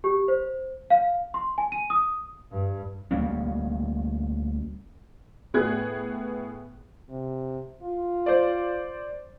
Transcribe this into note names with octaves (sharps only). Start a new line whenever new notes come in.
G4
C5
F5
C6
G#5
D#7
D#6
G2
D2 G3 A#3 C#4
A2 B3 G#4 F#6 G#6
C3
F4
C5 D5